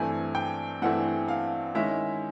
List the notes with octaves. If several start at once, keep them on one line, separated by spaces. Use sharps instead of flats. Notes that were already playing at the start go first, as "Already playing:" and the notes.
Already playing: G2 E3 A3 C4 E4 G#5
G5
G2 E3 A3 C4 E4 F#5
F5
D#3 G#3 C#4 E4 E5